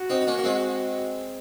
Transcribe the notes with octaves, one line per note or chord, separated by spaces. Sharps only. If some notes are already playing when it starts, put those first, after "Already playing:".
Already playing: F#4
C4 D#4
D#4
A#3 C#4
A#3
G#3 C4